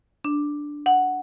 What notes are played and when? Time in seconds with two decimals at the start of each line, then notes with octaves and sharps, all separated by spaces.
0.25 D4
0.86 F#5